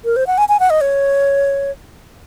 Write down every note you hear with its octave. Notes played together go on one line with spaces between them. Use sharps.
A#4
C5
F#5
G#5
G#5
F#5
D#5
C#5